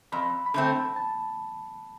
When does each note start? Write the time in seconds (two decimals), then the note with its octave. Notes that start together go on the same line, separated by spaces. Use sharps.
0.12 F2 B5
0.46 B5
0.54 D3 A3 C4 A5
0.96 A5